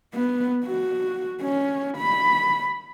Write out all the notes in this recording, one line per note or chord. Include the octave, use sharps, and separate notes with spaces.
B3
F#4
C#4
B5